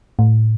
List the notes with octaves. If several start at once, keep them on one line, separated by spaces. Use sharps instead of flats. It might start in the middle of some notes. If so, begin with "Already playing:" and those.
A2